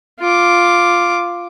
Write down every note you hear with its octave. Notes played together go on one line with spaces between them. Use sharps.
F4 D6